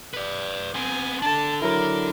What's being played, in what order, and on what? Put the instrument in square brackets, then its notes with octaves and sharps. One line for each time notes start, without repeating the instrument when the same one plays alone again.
[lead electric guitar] B4 D5
[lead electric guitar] B3 C4 [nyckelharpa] G#5
[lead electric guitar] D4 A4 [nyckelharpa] A5
[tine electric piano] F#3 E4 [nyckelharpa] A#4